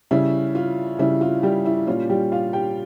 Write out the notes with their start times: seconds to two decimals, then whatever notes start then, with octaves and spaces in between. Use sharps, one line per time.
0.11 C#3 G3 C#4 E4
0.55 F4
0.99 C#3 G3 C#4 E4
1.21 F4
1.43 G3 G4
1.66 E4
1.87 A#2 G3 C#4 F4
2.09 G3 G4
2.32 F4 F5
2.53 G4 G5